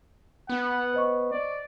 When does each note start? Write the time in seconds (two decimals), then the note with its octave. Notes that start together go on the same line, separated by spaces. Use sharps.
0.49 B3 F#5
0.94 C5 D#5 C#6
1.31 D5